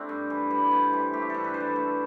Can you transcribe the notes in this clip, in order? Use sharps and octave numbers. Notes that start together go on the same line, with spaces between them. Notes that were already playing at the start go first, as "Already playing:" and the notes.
Already playing: A3 C4 D4 E4 G4
G2
E3
G3
C3
E3
A3 G4
G2 A4
B4
E3 C5
D5
A3